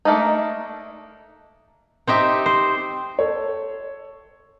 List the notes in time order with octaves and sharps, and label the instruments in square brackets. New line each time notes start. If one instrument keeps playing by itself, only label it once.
[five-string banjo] A3 A#3 D4 D#4
[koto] C4 D#4 G4 E5
C5
[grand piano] A4 C#5